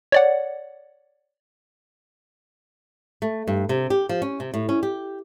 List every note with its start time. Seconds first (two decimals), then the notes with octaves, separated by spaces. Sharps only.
0.12 C#5 D5 F#5
3.22 A3
3.47 G2
3.69 C3
3.90 G4
4.09 F3
4.22 C#4
4.40 C3
4.54 A2
4.69 C#4
4.83 G4